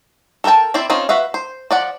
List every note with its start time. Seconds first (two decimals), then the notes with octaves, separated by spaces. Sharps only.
0.44 A4 A#4 D5 G5 A5
0.74 C4 E4 C5 D5
0.90 C4 C#4 D#4 F4
1.09 F#4 B4 E5 F5
1.34 C5
1.71 F3 D5 F#5